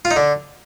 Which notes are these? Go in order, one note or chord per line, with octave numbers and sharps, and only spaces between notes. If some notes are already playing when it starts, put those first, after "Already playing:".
F4
D#4
D3